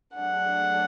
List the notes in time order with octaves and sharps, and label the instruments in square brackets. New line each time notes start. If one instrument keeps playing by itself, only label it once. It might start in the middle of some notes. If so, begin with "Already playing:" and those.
[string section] F#3 A3 D4 G#4 [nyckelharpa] F#5